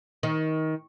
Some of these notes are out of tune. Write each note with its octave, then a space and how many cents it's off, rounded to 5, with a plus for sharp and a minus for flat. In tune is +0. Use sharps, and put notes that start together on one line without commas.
D#3 +20